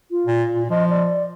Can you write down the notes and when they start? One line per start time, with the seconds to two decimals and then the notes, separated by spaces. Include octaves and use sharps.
0.11 F4
0.26 A#2
0.53 A#2
0.70 F3 D#5
0.90 D5